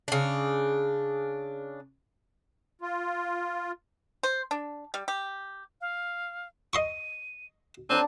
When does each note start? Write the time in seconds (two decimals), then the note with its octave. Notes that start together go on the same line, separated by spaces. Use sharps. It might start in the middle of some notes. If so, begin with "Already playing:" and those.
0.08 C#3 D4
2.82 F4
4.23 C5
4.51 D4
4.94 G3
5.08 G4
5.81 F5
6.73 D#5 C6 C#6 D#7
7.90 C4 D4 A5 A#5 D#7